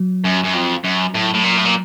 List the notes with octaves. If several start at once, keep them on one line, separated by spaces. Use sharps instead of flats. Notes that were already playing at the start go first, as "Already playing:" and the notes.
Already playing: F#3
F#2
F#2
F2
F#2
A2
A2
A#2
A2
A#2